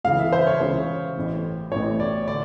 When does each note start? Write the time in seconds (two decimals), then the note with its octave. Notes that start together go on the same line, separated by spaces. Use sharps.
0.04 C#2 C#3 E3 F5
0.19 E5
0.32 C5
0.47 C#5
0.60 C#2 C#3 E3 C5
1.16 A1 A2 E3
1.71 A1 A2 E3 C#5
2.00 D5
2.27 D3 D5